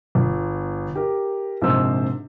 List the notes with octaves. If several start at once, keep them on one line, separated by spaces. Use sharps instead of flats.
G1
G4 A#4
A#1 G#2 C3 C5 E6